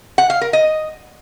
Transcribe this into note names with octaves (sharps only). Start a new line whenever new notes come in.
F#5
F5
A#4
D#5